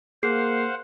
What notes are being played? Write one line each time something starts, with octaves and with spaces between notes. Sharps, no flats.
A#3 G#4 C5 F5 F#5 C7